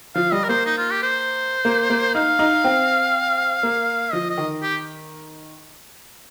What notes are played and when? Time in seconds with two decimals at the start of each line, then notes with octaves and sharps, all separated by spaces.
0.15 F3 F5
0.32 G3 D#5
0.44 A#4
0.49 A#3 C5
0.66 D#4
0.78 F4
0.90 G4
1.03 C5
1.65 A#3
1.90 A#3
2.15 D#4 F5
2.39 D#4
2.64 C4
3.63 A#3
4.12 F3 D#5
4.30 D#5
4.38 D#3
4.63 G4